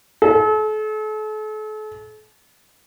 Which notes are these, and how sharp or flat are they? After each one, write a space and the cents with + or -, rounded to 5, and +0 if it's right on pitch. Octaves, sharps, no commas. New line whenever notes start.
A4 -40